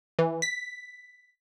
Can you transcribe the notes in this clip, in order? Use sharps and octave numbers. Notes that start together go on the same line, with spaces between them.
E3
B6